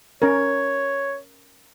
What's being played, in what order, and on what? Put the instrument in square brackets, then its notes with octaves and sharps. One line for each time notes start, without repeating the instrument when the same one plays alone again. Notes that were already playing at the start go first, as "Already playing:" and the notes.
[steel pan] C#4 A#4 [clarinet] C#5